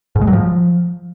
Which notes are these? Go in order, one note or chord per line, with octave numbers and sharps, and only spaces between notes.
G#2
G#3
F#3
F3